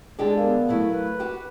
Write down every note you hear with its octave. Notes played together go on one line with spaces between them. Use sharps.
D3 G#3 G4 G#4 D5 A5
B3 A#4 F5
F#3 A3 E4
B4
F#4 G4